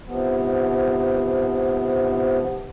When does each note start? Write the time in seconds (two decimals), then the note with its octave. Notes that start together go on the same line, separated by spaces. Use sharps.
0.07 G#2 C3 F3 B3